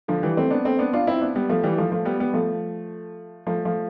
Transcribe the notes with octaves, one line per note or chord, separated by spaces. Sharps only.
D3 F3
E3 G3
A3 C4
B3 D4
A3 C4
B3 D4
D4 F4
C4 E4
B3 D4
G3 B3
F3 A3
E3 G3
F3 A3
F3 A3
G3 B3
G3 B3
F3 A3
F3 A3
F3 A3